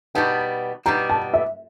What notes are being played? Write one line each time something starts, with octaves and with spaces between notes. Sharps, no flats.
B2 G3 B3 D#4 A5
B2 G3 B3 D#4 A#5
A5
E5